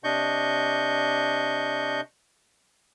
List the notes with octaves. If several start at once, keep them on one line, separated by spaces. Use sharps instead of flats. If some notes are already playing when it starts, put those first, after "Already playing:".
C3 D4 D#5 C#6 G6